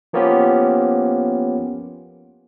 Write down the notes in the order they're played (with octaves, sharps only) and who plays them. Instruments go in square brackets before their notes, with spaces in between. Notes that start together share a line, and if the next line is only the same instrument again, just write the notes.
[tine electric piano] F3 A#3 B3 C#4 F4 G4